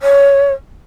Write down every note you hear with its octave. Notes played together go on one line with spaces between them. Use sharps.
C#5